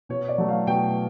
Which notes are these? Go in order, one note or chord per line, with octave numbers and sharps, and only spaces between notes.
B2 C#5
D5
F#3 A3
F5
B2 G5